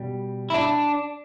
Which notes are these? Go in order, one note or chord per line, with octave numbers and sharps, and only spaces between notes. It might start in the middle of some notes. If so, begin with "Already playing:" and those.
Already playing: B2 G3
E4
D4